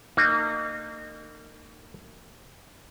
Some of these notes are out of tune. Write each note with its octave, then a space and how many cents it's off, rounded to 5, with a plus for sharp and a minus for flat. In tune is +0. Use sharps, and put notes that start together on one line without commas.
A#3 -30 D#4 -30